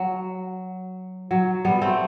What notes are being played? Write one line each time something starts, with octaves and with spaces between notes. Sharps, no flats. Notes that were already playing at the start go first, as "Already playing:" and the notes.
Already playing: F#3
F#3
G3 B3
A3 C4